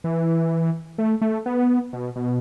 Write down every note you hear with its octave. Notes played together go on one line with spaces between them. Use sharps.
E3
A3
A3
B3
B2
B2